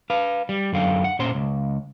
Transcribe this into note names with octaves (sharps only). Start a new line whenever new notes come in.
B4 F5
G3
F#2 D3 F5 G5
F#5
A#2 C#4 C5 C6
C#2